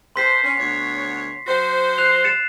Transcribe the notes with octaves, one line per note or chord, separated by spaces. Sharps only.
A4 B4 C5 C6 B6 C7
C#4
D2 B3 C#5
F#3 F#4 C5
F#6 C7 F7
A6 C#7 E7